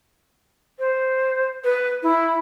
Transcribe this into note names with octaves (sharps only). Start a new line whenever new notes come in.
C5
B4
E4